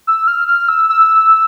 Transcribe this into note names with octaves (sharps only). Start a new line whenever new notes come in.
E6
F6
F6
E6
E6